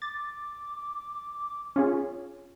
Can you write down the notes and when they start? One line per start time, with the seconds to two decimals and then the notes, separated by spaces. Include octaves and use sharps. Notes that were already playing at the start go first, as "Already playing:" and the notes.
0.02 D6 A6
1.76 C#4 F4 G#4